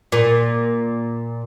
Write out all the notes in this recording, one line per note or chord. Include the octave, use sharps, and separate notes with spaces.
A#2